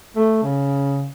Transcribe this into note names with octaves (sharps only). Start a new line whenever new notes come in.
A3
C#3